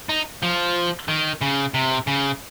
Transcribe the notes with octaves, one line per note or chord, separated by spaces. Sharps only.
D#4
F3
D#3
C#3
C3
C#3